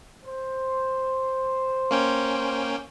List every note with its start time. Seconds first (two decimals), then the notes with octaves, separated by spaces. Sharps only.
0.24 C5
1.91 A#3 C#4 G5